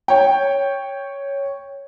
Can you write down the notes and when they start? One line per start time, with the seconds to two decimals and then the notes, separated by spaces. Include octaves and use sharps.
0.08 C#5 G5